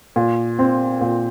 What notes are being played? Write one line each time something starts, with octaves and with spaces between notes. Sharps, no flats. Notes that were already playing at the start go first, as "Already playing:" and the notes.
A#2
C4
A#2